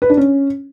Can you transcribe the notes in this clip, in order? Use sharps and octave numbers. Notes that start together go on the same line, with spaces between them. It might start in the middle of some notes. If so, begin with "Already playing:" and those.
B4
D4
C#4